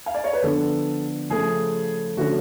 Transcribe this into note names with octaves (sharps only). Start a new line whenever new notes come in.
F5
D5
C#5
B4
D3 F3 B3 D4 A4
C#3 F3 A3 G#4
D3 F3 A3 C#4 F#4